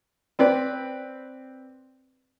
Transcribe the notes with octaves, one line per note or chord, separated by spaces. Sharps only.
C4 B4 D5